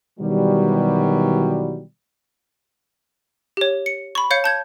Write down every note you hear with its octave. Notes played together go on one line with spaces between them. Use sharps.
B2 D#3 E3 F#3 G3
G4 C#5
C#7
B5 C#6
C#5 F5 G6 C#7
A5 G6 G#6